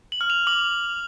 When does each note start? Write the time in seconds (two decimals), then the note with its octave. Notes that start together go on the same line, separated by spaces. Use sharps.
0.12 F#7
0.21 F6
0.30 F7
0.47 D6 F#7